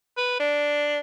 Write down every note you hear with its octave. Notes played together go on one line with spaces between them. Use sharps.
B4
D4